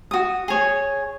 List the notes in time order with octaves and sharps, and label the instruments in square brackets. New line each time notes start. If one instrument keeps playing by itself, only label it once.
[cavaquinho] F#4 D#6
G#4 C#5